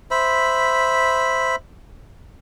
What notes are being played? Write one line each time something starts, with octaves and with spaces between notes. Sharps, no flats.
C5 E5 B5